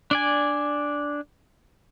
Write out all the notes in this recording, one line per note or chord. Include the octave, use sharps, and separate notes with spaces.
D4 D5 G#5